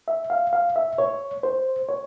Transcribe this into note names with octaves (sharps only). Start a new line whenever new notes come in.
E5
F5
F5
E5
C#5
C5
C#5